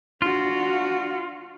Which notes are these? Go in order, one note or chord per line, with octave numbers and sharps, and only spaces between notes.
D4 F4 F#4